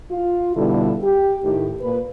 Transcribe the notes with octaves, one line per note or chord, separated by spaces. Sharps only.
F4
B2 D3 G3 E4 F4 A4
G4
A2 D#3 G4
A#2 B4